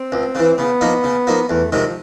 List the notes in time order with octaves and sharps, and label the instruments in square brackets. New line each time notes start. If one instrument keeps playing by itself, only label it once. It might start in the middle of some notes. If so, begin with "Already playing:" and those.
Already playing: [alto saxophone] C4
[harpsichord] C#2
C#3 E3
[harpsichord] C#3 [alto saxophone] B3
[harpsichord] F3 A#3 D#4
C#3
F3 A#3 D#4
[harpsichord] E2 [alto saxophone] A3
[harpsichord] C3 D#3 G#3 [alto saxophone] F3
[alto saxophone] F3